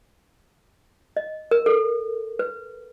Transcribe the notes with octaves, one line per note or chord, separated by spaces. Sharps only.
D#5
A#4
A4
B4